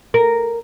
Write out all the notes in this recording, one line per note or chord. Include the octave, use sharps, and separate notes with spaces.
A#4